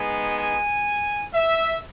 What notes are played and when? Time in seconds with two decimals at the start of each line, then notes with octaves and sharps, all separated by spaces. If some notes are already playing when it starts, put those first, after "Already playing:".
Already playing: G#3 B3 D#4 G#5
0.38 G#5
1.34 E5